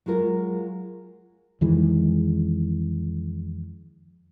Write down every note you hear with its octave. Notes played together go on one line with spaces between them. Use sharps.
F#3 G#3 F4 A#4
F2 D#3 E3 G#3